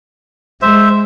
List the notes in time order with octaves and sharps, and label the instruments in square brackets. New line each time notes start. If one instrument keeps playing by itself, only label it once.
[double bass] G#3 [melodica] C5 E5